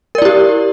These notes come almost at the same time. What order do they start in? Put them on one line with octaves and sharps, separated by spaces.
A#4 D5 E4 G4